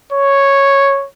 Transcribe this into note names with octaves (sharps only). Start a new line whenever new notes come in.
C#5